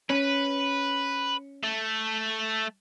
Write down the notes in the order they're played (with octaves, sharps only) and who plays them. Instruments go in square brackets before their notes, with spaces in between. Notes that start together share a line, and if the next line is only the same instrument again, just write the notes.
[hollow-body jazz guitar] C#4 [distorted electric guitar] B4
[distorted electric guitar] A3